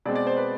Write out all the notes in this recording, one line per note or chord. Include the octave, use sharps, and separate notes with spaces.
B2 G#3 C4 D5
D5
C5
B4